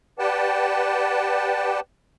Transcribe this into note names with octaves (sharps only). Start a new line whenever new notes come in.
G4 B4 D5 F#5 G5 A5